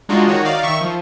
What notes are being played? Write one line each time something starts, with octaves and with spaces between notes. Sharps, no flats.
G#3 D4 D#4 F4 F#4
D#3 D#4 F#4 C#5
D#4 D5 F5
D#3 E5 C#6
F3